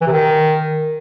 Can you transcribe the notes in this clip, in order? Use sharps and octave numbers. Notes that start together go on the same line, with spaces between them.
E3
C3
D#3